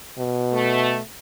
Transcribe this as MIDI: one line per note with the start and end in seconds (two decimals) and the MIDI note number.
0.19 0.99 47
0.53 0.99 57